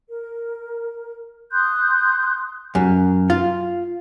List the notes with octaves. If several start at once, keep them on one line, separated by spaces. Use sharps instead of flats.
A#4
C6 D#6 F#6 G6
F#2
F4